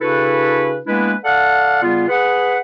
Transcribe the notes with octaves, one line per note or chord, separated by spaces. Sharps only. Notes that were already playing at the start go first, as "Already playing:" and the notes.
C#3 D4 E4 F#4 A4 B4
G#3 A#3 B3 D4 E4 B4
A4 D5 F5 F#5
C#3 G3 B3 F4
G#4 B4 F#5